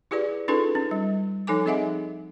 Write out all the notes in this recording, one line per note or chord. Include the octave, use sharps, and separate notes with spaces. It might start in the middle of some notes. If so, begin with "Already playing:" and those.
E4 G4 G#4 B4 D5
C#4 D#4 F4 G#4 A4 B4
C#4
G3
F3 D#4 A4 G#5 D6
C4 G#4 D#5 E5 F#5